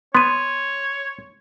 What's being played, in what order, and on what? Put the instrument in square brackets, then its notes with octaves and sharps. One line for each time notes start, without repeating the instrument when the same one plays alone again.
[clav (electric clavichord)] B3 [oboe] C#5 [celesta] C6 D#7